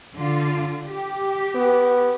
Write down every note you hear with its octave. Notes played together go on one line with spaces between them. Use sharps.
D3 F4
G4
B3